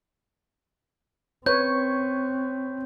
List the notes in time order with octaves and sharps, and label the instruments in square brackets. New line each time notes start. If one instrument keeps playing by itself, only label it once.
[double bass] C4 [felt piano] B4 [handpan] C#5 [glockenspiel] G6